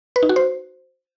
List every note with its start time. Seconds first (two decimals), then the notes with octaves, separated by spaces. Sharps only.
0.16 B4
0.23 D#4
0.29 F#4
0.36 C5